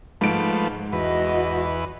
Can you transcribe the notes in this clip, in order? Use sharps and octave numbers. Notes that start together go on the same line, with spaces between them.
G#2 F3 A3 B4 D7
E2 F#4 B4 D#5